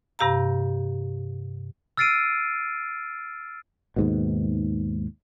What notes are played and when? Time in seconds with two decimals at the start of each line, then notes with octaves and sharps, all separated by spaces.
0.19 G2 C3 G4 F5 A#5
1.97 E6 F6 A6 C7 D7 D#7
3.96 D#2 G#2 B2